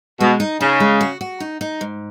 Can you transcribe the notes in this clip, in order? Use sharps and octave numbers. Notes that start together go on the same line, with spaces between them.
B2 G#3
D#4
C#3 D#4
G#3
F#4
F#4
D#4
D#4
G#2